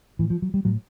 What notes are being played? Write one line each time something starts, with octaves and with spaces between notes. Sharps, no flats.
A2 E3
F3
F#3
G3
A2 F#3